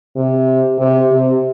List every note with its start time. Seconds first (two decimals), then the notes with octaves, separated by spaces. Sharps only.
0.16 C3
0.79 C3
1.11 C3